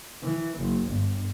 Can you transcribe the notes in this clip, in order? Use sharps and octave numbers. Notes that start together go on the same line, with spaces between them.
E3
F#1
G1